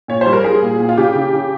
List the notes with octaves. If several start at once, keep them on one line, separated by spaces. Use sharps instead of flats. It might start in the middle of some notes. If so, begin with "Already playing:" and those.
A#2 C#5
C5
G3
A#4
G3 G#4
A#2
A#2
F4
C#3 G4
C#3
C#3